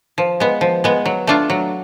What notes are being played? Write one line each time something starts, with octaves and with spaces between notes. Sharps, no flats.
F3
G#3 B3
F3
G#3 B3
F#3
A3 D4 F4
F#3